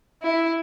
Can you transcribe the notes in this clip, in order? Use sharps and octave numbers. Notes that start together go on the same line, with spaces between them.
E4